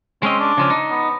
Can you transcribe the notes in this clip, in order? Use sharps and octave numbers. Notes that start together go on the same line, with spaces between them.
G#3 C4 C#4 D#5
D4
C#3 F3 C#4
D#4
B3